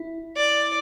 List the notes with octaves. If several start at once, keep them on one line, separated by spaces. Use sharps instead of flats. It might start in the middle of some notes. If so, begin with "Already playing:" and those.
Already playing: E4
D5